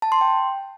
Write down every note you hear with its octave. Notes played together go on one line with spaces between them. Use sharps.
A5
C6
G5